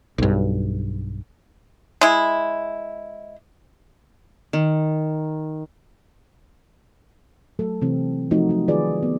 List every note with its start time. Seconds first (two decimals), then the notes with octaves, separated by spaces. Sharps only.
0.18 B1 G2
2.01 G#3 E4
4.53 D#3
7.59 F#3 A3 A4
7.81 C3 E3 C4
8.31 F3 A3 C4 D#4 F#4
8.49 F#3 F#4
8.68 D#3 F4 G#4 B4 D5
9.03 B3